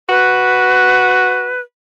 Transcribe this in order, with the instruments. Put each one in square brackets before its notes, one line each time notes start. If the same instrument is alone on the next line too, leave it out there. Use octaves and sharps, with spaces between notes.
[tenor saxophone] F#4 [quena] B4